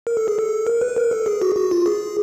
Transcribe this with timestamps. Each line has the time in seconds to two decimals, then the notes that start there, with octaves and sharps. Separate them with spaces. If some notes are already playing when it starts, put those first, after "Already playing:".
0.07 A#4
0.17 A4
0.28 G#4
0.39 A4
0.67 A#4
0.81 B4
0.96 A#4
1.11 A4
1.26 G#4
1.42 F#4
1.56 F#4
1.71 F4
1.86 G#4